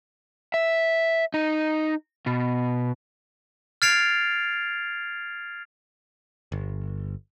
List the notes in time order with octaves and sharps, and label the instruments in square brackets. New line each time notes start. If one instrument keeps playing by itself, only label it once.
[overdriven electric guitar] E5
D#4
B2
[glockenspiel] F6 G#6 A6 C7 D7 F7
[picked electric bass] G1